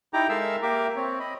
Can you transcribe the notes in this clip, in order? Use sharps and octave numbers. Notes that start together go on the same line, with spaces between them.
D#4 E4 G4 G5 A#5 D6
G#3 A4 A#4 E5 F5 E6
A#3 G4 A#4 E5 D6
C4 C#5
D#5 B5